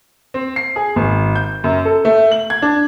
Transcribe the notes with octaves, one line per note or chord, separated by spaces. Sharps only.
C4
C7
G#4
G#1
G6
F#2
A4
A3
F#7
G#6
D4